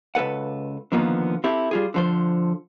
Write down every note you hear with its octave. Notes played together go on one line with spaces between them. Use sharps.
C#2 A4 B4 F#5
D3 D#3 F3 A#3 B3
C4 E4 G4 A4
G3 F4 G#4
D3 F3 C5